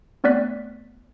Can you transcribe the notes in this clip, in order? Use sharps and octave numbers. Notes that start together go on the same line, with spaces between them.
A3 B3 C4 D5 F#6 B6